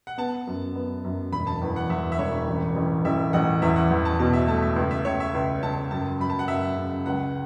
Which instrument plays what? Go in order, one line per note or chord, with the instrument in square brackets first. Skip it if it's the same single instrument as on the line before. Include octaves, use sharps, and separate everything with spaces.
[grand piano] F#5
[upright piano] B3 [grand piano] A5
[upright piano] F#2
B3
F#2
[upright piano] E1 [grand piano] B5
[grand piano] A5
[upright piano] E2
[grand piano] F#5
[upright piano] E2 [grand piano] E5
[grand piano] E5
[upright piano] E1 [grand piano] C#5
[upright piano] A1
A1
[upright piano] A1 [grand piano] E5
[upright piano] A1 [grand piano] F#5
[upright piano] E2 [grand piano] E5
[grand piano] F#5
[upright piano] E2
[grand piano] A5
[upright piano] B2 [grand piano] A5
[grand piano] E5
[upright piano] A3 [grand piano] A5
[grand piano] E5
[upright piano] C#2
[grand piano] E5
[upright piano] C#2 [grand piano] C#5
[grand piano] E5
[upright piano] C#2
[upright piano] C#2 [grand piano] A5
[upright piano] F#2 [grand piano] A5
[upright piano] F#2 [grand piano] B5
[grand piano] A5
F#5
[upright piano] F#2 [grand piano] E5
[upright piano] C#3
[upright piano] C#2 [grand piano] F#5